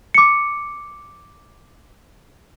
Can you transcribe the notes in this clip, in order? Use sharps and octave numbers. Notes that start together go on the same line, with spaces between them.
D6 C#7